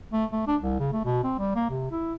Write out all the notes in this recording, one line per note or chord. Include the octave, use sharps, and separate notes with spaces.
A3
A3
D4
C2
C#3
A3
B2
C4
G3
A#3
C3
E4